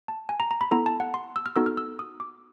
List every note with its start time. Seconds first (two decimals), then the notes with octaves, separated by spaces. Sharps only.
0.08 A5
0.29 G#5
0.40 A#5
0.51 A#5
0.61 B5
0.71 B3 E4 A4 A#5
0.86 A5
1.00 F#5
1.14 C6
1.36 E6
1.46 F6
1.56 B3 D#4 F#4 A4 E6
1.66 F6
1.77 E6
1.99 D#6
2.20 D6